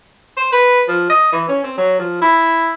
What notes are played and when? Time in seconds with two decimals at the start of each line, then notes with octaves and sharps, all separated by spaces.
0.37 C5
0.52 B4
0.88 F3
1.10 D#5
1.32 E3
1.49 C#4
1.63 C4
1.77 F#3
1.99 F3
2.21 E4